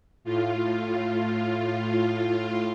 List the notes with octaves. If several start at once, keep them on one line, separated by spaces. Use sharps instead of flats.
A2 F4